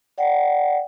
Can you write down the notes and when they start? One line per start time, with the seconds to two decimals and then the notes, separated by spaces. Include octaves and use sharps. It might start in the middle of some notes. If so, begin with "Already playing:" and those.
0.18 D5 F#5 G5